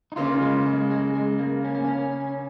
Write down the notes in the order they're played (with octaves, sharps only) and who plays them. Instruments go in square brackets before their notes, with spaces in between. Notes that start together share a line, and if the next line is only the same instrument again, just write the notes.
[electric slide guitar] D#4
[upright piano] C#3 A#3 C#4 [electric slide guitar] F4
[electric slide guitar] G#3
G#3
G#3
G#3
A#3
C#4
A#3
C#4